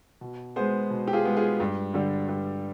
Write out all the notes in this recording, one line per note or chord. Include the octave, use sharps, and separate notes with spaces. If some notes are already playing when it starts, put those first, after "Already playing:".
B2
G#3 B3 G#4 C5
B2
G4
F4 G#4
G#3 B3
F4 G#4
G2
D3 G3
G2